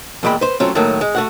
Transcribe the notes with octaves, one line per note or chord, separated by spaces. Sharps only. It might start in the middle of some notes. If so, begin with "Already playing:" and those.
E2 A#2 G#3 G5 B5
B4 C5
F#3 A3 C4 C#4 F4
A2 D#3 F#3 A3 A#3
G#3
A3 F#4 F#5